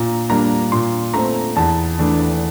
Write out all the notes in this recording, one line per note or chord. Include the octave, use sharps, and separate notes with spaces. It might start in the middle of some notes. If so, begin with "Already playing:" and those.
Already playing: A#2 A#5
G3 A#3 D4 A#5
A#2 C6
A3 C4 A#5
E2 A5
E3 A3 D4